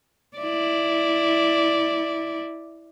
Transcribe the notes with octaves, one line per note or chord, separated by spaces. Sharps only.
E4 D5